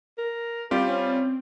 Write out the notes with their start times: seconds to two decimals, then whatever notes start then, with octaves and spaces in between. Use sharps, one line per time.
0.18 A#4
0.71 G3 C4 F4 G4
0.88 C#4